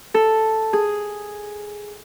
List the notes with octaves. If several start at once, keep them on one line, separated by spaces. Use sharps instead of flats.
A4
G#4